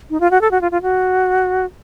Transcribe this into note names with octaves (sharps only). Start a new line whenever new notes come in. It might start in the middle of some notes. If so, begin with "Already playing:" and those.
D#4
F4
F#4
A4
F#4
F4
F4
F#4